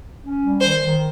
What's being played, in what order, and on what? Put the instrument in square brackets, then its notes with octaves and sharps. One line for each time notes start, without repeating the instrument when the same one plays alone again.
[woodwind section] C#4
G3
[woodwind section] D#3 [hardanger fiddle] C5
[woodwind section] D#3